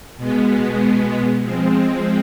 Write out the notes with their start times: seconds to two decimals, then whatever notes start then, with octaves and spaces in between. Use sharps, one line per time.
0.17 B2 G#3 B3
1.41 F3 G#3 C4